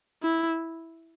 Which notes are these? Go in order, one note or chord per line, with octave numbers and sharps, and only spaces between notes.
E4